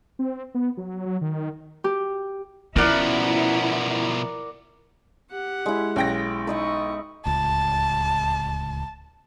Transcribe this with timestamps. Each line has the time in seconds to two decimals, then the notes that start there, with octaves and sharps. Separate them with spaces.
0.19 C4
0.54 B3
0.77 F#3
1.06 F#3
1.21 D#3
1.84 G4
2.76 B2 F3 C#4 E4 A#4 D5 F#5
5.30 G4 F#5
5.66 G#3 E4
5.96 B1 C#4 G5 A#6
6.47 D#4 B4 D#5 E5 C#6
7.26 D1 C#2 A5